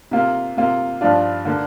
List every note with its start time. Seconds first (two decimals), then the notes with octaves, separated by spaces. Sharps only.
0.11 C3 A#3 F4
0.57 C3 A#3 F4
1.01 G2 F3 D4 F4
1.45 D3 A#3